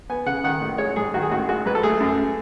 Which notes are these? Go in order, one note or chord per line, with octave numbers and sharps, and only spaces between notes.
B3 G#5
C#3 F#5
D#3 F#5
A1
G#3 C#5
G#2 G#4
D#3 F#4
G#4
A1 F#4
G#3 F#4
G#2 B4
A4
A3 G#4
F#2